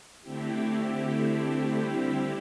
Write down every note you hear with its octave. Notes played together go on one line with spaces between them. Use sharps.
D3 A3 C4 E4 G4
D3 G3 C4 E4 G4